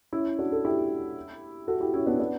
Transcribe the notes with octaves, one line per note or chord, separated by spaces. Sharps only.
C#4 E4
D4 F#4
A4
E4 G4
F#4 A4
E4 G4
C#4 E4
B3 D4
B3 D4